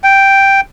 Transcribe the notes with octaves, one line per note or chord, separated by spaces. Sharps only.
G5